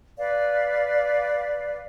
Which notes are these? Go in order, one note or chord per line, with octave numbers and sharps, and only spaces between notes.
B4 D5 F5